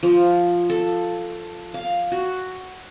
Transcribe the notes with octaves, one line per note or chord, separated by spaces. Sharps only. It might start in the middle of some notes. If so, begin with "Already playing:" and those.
F3
A4
F5
F#4